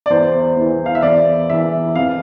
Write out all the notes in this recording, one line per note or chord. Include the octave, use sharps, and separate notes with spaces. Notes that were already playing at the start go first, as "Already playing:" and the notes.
D5
E2 E3 C5
E2 E3
F5
E5
E2 E3 D5
E2 E3 E5
F2 E3 F5